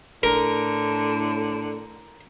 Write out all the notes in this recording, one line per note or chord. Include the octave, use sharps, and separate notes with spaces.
A2 D3 A#4